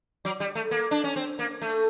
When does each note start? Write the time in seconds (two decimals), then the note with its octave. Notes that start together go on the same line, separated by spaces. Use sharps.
0.25 F#3
0.40 G3
0.55 A3
0.71 A#3
0.91 D4
1.04 C#4
1.16 C4
1.39 A#3
1.62 A3